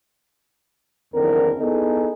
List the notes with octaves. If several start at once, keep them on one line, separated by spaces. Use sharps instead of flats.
F#1 E2 D3 D#3 C4 A#4
B3 D#4 E4 G#4 A4